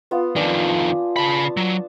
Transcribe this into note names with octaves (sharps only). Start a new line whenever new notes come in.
B3 F4
F2 D#3 D4 G#5
C#3 A5 B5
F#3